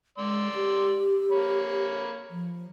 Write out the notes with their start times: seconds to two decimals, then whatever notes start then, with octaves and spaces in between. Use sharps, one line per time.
0.18 G#3 D5 C6 E6
0.55 G4
1.31 A#3 C#5 B5
2.30 F3